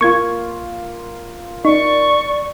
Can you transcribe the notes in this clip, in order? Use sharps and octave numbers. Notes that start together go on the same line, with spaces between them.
A#3 F4 C#6 G#6
D#4 D5 C#6